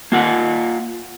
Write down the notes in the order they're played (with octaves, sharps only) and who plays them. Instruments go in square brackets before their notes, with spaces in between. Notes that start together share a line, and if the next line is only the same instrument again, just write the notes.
[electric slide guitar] A#3 F4 F#5